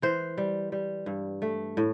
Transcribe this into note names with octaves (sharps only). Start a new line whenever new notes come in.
E3 C5
G3
G3
G2
A3
A2